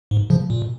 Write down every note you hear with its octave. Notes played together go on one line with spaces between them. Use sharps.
G#2
C#3 F3
A#2